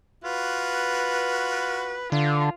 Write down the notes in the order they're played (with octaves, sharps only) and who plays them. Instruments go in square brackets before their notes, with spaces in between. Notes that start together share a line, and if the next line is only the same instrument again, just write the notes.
[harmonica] F4 F#4 [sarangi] B4
[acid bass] D3 [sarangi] F4